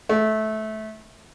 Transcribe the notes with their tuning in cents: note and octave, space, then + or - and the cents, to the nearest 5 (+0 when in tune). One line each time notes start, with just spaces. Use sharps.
A3 -20